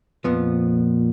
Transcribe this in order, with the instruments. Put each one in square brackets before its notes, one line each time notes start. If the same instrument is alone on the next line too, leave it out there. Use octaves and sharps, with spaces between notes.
[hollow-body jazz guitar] F2 F3 B3 [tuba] A#2